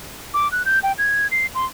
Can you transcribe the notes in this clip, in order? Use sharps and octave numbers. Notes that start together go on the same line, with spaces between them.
D6
F#6
G6
G5
G#6
C7
C6